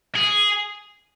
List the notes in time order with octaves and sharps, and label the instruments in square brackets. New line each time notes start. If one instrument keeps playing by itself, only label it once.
[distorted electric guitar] G#4